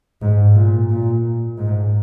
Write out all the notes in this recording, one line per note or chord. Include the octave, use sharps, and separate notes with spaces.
G#2
A#2
A#2
G#2